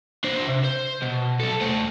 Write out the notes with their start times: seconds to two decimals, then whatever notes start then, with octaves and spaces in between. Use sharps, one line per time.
0.24 D4 C5
0.47 C3
0.64 C5
1.02 B2
1.40 B1 A4
1.61 A3 C5